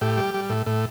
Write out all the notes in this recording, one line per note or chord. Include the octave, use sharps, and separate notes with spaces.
A2 G4
G3
G3
A2
A2